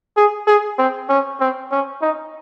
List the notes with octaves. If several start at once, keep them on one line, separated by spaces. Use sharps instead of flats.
G#4
G#4
C4
C#4
C4
C#4
D#4